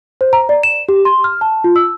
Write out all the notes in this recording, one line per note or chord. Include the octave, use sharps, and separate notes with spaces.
C5
A#5
D5
E7
G4
C6
F6
A5
F4
E6